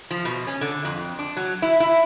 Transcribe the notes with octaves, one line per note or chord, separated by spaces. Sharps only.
F3
B2
C#4
D3
F2
D4
F#3
E4
E4